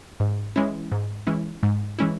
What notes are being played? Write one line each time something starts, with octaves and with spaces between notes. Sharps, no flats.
G#2
E3 G#3 C#4 E4
G#2
E3 G#3 C#4 E4
G#2
E3 G#3 C#4 E4